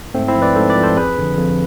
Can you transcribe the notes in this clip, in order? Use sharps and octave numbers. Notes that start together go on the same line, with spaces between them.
G#2 A3 C4
C4 E4
F3
B4 D5
G#2 A4 C5
B4 D5
F3
A4 C5
F2 G#4 B4
D3 F3
F2